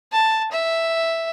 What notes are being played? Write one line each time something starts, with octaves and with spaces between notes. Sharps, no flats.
A5
E5